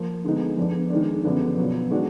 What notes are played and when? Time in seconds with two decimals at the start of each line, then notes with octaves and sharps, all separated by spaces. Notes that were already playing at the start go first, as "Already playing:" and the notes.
Already playing: F3 A#3
0.24 D3 G#3 B3 D#4
0.57 F2 F3 B3 D4
0.90 D#3 G#3 D4
1.24 F#2 D3 F3 B3 D4
1.57 B2 F#3 B3 F4
1.91 D#3 G#3 D4 F#4